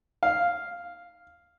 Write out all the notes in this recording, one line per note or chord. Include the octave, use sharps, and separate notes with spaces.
F5